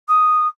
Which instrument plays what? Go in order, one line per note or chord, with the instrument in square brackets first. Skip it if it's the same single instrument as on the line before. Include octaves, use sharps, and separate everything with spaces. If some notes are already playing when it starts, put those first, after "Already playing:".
[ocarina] D#6